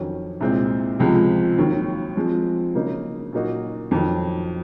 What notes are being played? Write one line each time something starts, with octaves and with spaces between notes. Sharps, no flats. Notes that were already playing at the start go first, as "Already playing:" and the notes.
Already playing: F2 D#3 F#3 C#4
C2 A#2 G#3 C4
C#2 C3 F3 G#3
D#2 D#3 F#3
F3 G#3 C4
C#3 F#3 A#3 D#4
A#2 F#3 A#3 D#4 F#4
F2 D#3 F#3